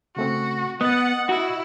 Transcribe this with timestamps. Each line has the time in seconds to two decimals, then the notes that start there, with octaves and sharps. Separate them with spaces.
0.17 C#3 A3 C4 F#4
0.81 B3 D#5 F#5 D#6 F#6 A6
1.29 E4 F#4